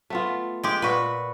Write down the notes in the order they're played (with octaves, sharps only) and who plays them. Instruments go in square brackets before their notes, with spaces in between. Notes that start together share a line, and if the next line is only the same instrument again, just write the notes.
[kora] A3 B3 F4
[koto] G#3 G4
[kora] A#2 [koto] F#4 B4